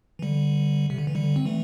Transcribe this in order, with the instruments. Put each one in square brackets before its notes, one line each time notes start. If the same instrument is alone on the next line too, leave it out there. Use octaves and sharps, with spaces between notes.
[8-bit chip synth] E3
D3 G3
C3
D3
E3
D3 G3
C4
E3 A3